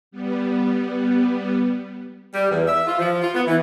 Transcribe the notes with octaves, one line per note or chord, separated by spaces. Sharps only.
G3 B3
G3
E2
E5
F4
F3
F4
B3
E3